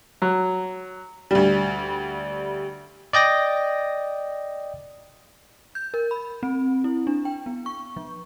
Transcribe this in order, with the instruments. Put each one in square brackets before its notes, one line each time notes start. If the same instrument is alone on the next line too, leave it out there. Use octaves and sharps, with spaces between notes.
[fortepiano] F#3
[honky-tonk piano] D2 G3
[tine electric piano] D5 D#5 G5 A#6
[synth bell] G6
A#4
B5
C4
E4
D4
G5
B3
C#6
F3